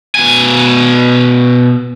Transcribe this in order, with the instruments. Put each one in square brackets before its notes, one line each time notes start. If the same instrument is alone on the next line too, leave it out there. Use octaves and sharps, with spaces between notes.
[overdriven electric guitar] B2 G#5